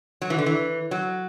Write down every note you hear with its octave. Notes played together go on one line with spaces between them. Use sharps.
F#3
E3
D3
E3
F#3